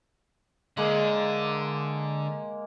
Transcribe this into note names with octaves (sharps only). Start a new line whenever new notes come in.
D3 G#3 A#3